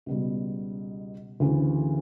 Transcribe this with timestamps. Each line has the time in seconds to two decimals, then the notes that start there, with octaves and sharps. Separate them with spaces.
0.06 C#2 B2 G3
1.40 D2 C#3 E3